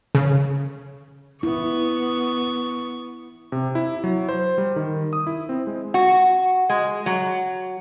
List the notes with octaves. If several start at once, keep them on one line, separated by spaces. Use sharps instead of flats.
C#3
B3 E4 C#6
C3
E4
F#3
C5
G3
D#3
D#6
E4
C4
G#3
F#4
G#3
F#3